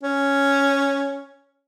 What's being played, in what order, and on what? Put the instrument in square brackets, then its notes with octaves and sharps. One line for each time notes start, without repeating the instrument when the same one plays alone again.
[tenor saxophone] C#4